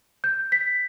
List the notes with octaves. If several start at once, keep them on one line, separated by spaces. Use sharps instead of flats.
G6
B6